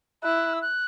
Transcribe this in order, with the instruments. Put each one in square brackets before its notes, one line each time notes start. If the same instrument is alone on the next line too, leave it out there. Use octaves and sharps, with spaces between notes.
[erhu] E4 [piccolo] F#6
[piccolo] E6
F#6